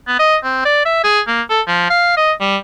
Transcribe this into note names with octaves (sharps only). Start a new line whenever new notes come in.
B3
D#5
C4
D5
E5
G#4
A#3
A4
F3
F5
D#5
G3